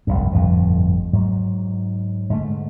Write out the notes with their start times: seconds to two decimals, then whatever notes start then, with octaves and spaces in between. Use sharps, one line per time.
0.07 F1 C2 G2
0.33 G1 F2 A2 F3
1.13 G#2 F#3
2.30 G#2 D3 A3